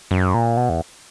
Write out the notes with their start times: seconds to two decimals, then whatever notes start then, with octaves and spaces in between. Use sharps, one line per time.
0.11 F#2
0.34 A#2
0.57 B2
0.69 E2